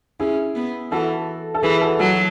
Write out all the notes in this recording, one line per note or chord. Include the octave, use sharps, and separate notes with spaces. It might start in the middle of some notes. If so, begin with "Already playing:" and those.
C#4 E4 G#4
B3
E3 F#4 A4
A4
E3 G#4 B4
F#4 A4
F#3 F#4 A4